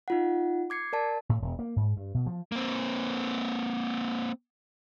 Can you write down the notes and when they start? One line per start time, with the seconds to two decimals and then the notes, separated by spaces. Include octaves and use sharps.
0.08 D#4 F4 F#5
0.70 D6 G#6 C7 C#7
0.93 A#4 D5 A5
1.29 A2
1.42 E1
1.59 A#3
1.76 G#2
1.97 G2
2.14 B2
2.26 F3
2.52 A#3 C4